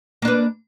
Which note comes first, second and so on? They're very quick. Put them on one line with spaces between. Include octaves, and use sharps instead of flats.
A#3 D4 B4